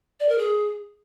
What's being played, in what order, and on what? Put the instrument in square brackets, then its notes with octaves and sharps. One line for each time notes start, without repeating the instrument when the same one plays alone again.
[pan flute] D5
A#4
G#4